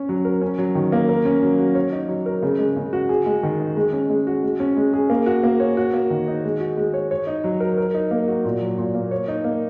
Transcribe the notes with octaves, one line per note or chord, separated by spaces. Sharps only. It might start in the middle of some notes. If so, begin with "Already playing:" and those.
Already playing: C#4 C#5
F#3
A#4
C#4
F#3
D#3
A#3
A#4
C#4
F#3
F#4
C#5
D#4
F#3
A#4
C#3
G#3
C#3
F#4
G#4
G#3
D#3
D#4
G#3
C#4
G#3
F#4
G#3
C#4
G#3
G#4
A#3
F#4
A#3
C#5
F#4
A#3
D#3
D#4
G#3
F#4
G#3
C#5
C#5
D#4
F#3
A#4
A#4
D#4
A#3
F#4
A#2
F#3
A#2
A#3
C#5
D#4
A#3